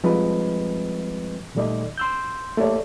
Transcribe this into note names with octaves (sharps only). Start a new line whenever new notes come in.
F3 G3 G#3 C4 B4 D#5
A#2 D#3 G3 A3 D5 D#5
C6 E6 G6
A3 A#3 G4 C#5 D5